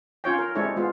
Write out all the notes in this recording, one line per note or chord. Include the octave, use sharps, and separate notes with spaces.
C#4 F4 C#5 G5
A#4
G#3 C4 D4 E4 A4 C#5
G#3 B3 F4